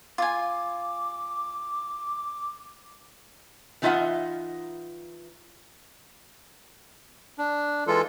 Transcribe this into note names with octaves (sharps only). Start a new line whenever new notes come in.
F4 G#5 D6
E3 D#4 F4 D#5 E5 F#5
D4
E3 G#3 F4 A4